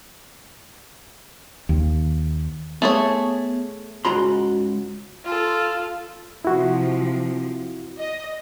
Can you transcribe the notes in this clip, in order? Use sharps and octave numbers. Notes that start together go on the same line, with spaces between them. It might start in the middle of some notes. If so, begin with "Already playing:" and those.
D#2
A3 B3 G#4 C#5
C#2 G#2 F#4 A#5 C6
F4 A4
C3 F3 E4 F#4
D#5